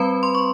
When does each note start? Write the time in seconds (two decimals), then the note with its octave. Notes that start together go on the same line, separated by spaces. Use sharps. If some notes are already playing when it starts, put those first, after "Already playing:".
Already playing: G3 C4 B4 B5
0.23 C6
0.35 C#6